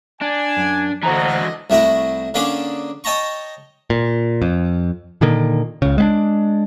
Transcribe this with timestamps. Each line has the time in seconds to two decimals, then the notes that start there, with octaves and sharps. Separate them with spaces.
0.22 D4 G#5
0.57 F#2
1.03 D2 E3 D4 F#4 A4 C5 D#5 A#5
1.70 C2 A3 E4 F#4 A#5
2.34 D3 A#3 C#4 D4 G#4 D6
3.04 C#5 D#5 G5 A5 A#5 C#6
3.90 A#2
4.42 F2
5.21 A#2 D3 D#3 A#3
5.82 C#2 C#3
5.98 G#3 B3 D4